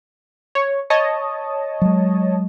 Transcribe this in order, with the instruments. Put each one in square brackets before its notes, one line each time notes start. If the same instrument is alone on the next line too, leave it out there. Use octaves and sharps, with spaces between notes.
[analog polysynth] C#5
C#5 D#5 A5
[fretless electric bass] F#3 G#3